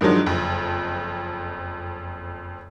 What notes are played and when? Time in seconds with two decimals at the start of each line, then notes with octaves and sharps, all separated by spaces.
0.01 G2 D#3 F3 F#3 G#3
0.26 F#1 F2